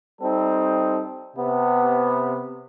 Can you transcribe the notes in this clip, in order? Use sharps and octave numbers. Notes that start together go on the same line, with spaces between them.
G3 C4 D#4 A4
C3 B3